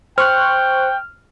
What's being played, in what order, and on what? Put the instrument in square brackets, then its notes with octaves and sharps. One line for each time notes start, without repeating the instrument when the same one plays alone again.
[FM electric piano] C5 C#6 F#6 [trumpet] G5 [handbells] F6